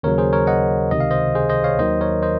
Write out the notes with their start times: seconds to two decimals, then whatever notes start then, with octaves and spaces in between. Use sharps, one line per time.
0.03 D#2 C#3 F#3 A#4 C#5
0.18 G#4 C5
0.33 A#4 C#5
0.47 D#5 F#5
0.91 C#2 C3 D#3 D#5
1.00 F5
1.11 C5 D#5
1.35 G#4 C5
1.49 C5 D#5
1.64 C#5 F5
1.79 D#2 D#3 F#3 C5 D#5
2.01 A#4 C#5
2.23 C5 D#5